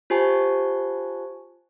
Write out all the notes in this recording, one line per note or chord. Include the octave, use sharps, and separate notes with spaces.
F4 G4 C5 G#5 A5 C#6